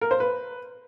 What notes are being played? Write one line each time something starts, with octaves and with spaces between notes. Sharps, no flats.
A#4
C5
B4